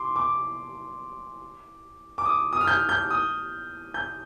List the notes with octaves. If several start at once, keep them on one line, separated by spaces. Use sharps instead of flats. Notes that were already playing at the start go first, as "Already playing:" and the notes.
Already playing: C6 D6
D6
D6
D#6
D#6
F6
G6
G6
D#6
G6